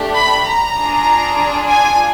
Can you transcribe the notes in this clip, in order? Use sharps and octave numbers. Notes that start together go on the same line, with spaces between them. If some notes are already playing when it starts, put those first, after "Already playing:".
Already playing: A3 D4 G4
B5
A#5
D4 F4 G#4
G#5